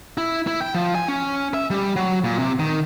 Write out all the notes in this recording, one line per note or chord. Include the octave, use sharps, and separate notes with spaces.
E4
E4
G5
F3
G#5
C#4
E5
G3
F#3
A#2
C3
D#3